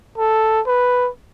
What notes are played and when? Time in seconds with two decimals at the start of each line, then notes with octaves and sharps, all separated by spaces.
0.18 A4
0.67 B4